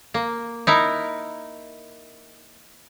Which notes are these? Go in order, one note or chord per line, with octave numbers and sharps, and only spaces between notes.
A#3
D#4 E4 A#4